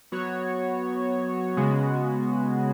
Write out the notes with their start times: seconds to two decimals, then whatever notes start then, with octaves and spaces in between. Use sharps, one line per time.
0.12 F#3 B3 F#4 C#5
1.57 C#3 G#3 B3 F#4